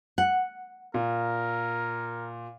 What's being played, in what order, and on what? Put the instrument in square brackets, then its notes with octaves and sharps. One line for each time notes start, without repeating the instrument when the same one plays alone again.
[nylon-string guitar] F#5
[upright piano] A#2 [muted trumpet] A#4